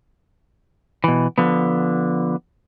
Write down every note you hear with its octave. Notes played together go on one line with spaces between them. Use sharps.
B2 E3
D3 F3 B3